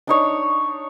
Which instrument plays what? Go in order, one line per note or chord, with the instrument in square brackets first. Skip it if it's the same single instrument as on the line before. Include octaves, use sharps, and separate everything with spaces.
[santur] D4 D#4 C#5